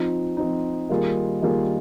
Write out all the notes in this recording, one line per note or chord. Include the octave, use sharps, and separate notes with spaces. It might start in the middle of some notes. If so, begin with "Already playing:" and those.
Already playing: F3 C4 D#4
F3 C4 D#4
D#3 G3 A#3 F4 G#4
D#3 G3 A#3 F4 G#4